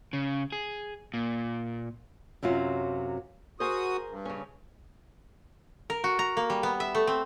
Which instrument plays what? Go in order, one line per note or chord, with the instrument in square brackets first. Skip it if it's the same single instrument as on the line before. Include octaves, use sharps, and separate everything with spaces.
[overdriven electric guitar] C#3
G#4
A#2
[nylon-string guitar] F#2 C3 F#3 F4
[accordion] F#4 D#6 [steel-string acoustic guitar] G#4 A#4 C5
[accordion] G2
[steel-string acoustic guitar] C#3 C#4
[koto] A#4
F#4
A#5
A#3
G3
B3
E5
A3
C4